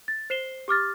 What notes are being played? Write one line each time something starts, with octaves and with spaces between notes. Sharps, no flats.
A6
C5 C7 E7 G7
G4 D6 F6 A6